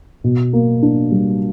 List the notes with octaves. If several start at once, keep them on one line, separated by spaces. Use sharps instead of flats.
B2
A#3
D4
G3